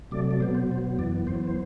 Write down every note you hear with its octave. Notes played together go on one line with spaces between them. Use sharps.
C3 F#3 A3 D5
D5
B2 F#3 B3 C5
C5
B2 F#3 B3 C5
F#2 E3 B3 D5
F#2 E3 B3 C5
C5